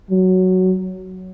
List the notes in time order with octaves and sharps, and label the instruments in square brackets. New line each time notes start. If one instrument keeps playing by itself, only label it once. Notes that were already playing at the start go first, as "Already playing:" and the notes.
[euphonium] F#3